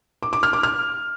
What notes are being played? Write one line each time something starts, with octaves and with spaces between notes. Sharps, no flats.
D6
D6
F6
D6
F6